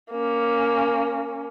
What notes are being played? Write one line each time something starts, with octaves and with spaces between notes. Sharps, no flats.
A#3 C#4